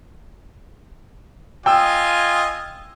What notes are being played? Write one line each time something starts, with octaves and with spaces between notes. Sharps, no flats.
F4 D#5 G5 G#5 E6